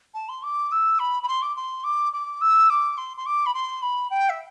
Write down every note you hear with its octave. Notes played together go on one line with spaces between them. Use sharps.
A5
C6
D6
E6
B5
B5
C6
D6
C6
D6
D6
E6
D6
C6
C6
D6
B5
C6
B5
G5
E5